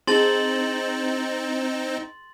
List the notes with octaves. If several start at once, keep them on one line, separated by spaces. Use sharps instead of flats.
C4 D#4 E4 G#4 A5 C6 A6 F#7